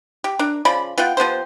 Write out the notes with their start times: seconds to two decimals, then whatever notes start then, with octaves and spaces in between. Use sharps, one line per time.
0.24 G4
0.39 D4 A#4
0.65 C#3 F3 D5 B5
0.98 B3 F4 F#5 G5
1.17 F3 B3 G4 C5